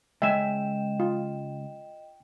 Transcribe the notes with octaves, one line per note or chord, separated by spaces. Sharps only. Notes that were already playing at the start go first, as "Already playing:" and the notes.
C#2 G#3 D#5 E5 G5 G#5 E7
F4